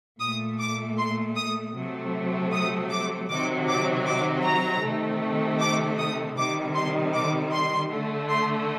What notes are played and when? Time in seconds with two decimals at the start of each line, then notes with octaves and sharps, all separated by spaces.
0.21 A#2 A3 D#6
0.60 D6
0.98 C6
1.37 D#6
1.75 C3 F#3 A3
2.52 D#6
2.90 D6
3.29 C3 D#3 F#3 D6
3.68 D6
4.06 D6
4.44 A#5
4.83 C3 D#3 A3
5.60 D6
5.99 D#6
6.37 C3 D#3 G3 D6
6.75 C6
7.14 D6
7.53 C6
7.91 D3 A3
8.29 C6